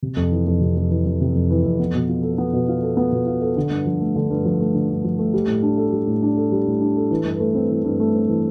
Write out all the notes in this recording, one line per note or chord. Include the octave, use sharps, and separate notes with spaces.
C3
F2
E3
F2
C3
F2
E3
F2
C3
F2
E3
F2
B3
B2
F4
A4
B3
B2
F4
A4
B3
B2
F4
A4
D3
G2
F3
A3
D3
G2
F3
A3
D3
G2
F3
A3
G3
A2
D4
A4
G3
A2
D4
A4
G3
A2
D4
A4
E3
G2
A3
C4
E3
G2
A3
C4
E3